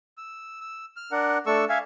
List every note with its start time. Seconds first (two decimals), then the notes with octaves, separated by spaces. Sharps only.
0.18 E6
0.61 E6
0.96 F6
1.12 D4 A#4 F#5
1.46 A3 D4 A4 C#6 E6
1.69 E5 F5 G#5